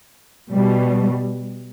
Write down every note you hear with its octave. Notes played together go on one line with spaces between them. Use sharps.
B2 G3